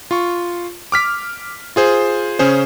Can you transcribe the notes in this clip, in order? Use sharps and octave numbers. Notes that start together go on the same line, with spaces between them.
F4 C#6
D6 F6 B6
F4 G#4 C5
C#3 C#4 G#4 C5